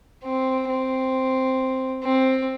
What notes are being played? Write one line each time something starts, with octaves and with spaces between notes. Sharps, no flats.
C4
C4
C4